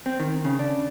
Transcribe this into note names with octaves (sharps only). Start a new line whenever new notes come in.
C4
D#3
C#3
D4